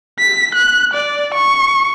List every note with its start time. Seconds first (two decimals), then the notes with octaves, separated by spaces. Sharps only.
0.19 B6
0.54 F#6
0.93 D5
1.34 C#6